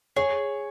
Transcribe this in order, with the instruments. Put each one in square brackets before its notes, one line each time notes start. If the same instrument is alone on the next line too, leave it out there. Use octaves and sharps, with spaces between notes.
[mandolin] G#4 [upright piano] C#5